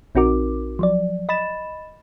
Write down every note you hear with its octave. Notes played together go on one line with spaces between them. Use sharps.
A#1 C4 D#4 F#4 A#4 D6
F3 F#3 D5
D#5 B5 A6 E7